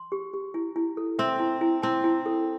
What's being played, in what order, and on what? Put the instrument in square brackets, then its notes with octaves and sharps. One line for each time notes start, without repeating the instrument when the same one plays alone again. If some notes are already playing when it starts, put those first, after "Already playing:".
Already playing: [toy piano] C6
G4
G4
E4
E4
A4
[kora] C4 [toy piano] E5
[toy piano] E4
E4
[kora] C4 [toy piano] A5
[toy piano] E4
A4